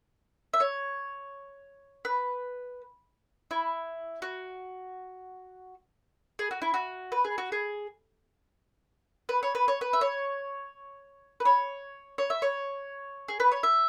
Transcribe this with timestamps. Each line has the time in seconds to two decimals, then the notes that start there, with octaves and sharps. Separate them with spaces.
0.54 E5
0.60 C#5
2.05 B4
3.51 E4
4.22 F#4
6.39 G#4
6.51 F#4
6.62 E4
6.74 F#4
7.12 B4
7.25 G#4
7.38 F#4
7.52 G#4
9.29 B4
9.43 C#5
9.55 B4
9.68 C#5
9.81 B4
9.93 E5
10.01 C#5
11.40 B4
11.45 C#5
12.18 C#5
12.30 E5
12.42 C#5
13.28 G#4
13.40 B4
13.52 C#5
13.63 E5